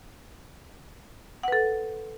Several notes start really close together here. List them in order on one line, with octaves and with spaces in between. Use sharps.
F#5 B4 A4